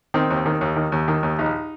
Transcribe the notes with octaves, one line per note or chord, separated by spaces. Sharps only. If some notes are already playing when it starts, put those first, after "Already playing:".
D#3 C4
D#2
D#3
D#2
D#3
D#2
D#3
D#2
A#1 D#4